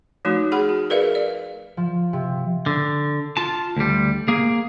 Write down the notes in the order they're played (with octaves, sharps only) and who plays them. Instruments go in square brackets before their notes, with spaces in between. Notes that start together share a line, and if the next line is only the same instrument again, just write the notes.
[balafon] F3 A3 D#4 F#4
G#4 F#5 B5
F#4
G#4 A#4 B4 D5 E5 F5
D5
[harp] F3
C3
[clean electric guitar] D3
F4 A5
D2 G3
A#3 G#4